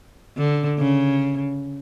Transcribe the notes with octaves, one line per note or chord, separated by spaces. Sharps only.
D3
C#3